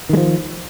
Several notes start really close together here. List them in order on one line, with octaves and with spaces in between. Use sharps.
D#3 G#3 F3